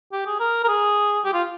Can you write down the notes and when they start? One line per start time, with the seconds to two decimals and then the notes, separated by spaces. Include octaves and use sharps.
0.12 G4
0.26 G#4
0.40 A#4
0.64 A#4
0.68 G#4
1.25 G4
1.34 F4